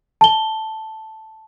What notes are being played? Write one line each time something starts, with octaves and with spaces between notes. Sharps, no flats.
A5 G7